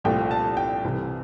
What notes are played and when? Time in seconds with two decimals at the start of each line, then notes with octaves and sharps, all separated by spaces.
0.04 C2 A#2 F3 A3 G5
0.31 A5
0.57 G5
0.84 C2 C3 E3